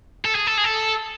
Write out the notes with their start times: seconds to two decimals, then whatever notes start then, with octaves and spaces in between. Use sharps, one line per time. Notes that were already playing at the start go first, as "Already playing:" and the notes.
0.25 A4
0.35 G#4
0.47 A4
0.58 G#4
0.64 A4